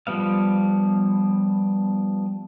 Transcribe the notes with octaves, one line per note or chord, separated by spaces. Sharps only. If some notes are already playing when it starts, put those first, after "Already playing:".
F3 G3 B3 F5